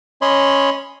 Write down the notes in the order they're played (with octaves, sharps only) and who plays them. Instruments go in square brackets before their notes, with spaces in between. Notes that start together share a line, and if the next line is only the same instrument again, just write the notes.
[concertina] C#4 C#5 D#5 B5 C6